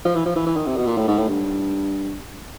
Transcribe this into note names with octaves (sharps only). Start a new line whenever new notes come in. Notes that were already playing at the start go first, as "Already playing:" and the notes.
F3
E3
F3
E3
E3
D#3
C3
B2
A#2
A2
G#2
A2
G2